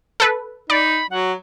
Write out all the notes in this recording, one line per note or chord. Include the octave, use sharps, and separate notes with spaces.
A4 B4
D#4 D5 B5
F#3 F#5